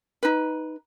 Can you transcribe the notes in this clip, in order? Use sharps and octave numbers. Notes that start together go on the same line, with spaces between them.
D#4 B4